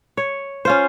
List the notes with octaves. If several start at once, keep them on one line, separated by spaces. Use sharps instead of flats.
C#5
C#4 F4 C5